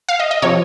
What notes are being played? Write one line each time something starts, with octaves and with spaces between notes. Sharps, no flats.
F5
D#5
D#5
C3 F3 C#5